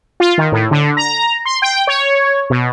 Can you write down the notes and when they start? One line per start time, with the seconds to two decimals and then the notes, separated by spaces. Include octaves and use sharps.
0.20 F4
0.38 D#3
0.52 A2
0.71 D3
0.97 A#5
1.45 C6
1.62 G5
1.87 C#5
2.50 B2